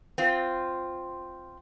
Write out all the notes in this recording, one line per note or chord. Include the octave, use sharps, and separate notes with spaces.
C4 F4